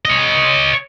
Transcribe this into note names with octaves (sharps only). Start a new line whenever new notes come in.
C#5 D#5